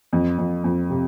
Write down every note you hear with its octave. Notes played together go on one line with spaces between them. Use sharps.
F2
F2
F2
C3